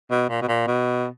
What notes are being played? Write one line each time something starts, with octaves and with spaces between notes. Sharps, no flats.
B2
A#2
B2
A#2
B2